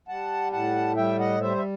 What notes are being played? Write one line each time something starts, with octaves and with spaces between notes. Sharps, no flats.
G3 F#5 A5
A2 F#5 A5
G3 E5 G5
D#5 F#5
G3 C5 E5
E5